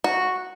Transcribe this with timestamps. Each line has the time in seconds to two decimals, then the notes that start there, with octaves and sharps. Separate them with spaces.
0.04 F#4